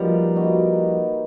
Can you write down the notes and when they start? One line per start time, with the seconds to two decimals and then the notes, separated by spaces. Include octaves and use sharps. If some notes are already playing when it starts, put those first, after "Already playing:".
Already playing: F3 G3 A#3 D#4 F#4 B4
0.35 A#3 D#4 F#4 B4